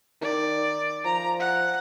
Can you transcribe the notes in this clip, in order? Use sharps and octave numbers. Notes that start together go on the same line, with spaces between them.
D#3 D5
F3 A#5
F#5